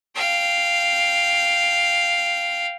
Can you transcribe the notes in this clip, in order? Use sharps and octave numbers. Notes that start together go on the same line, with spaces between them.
F5 G5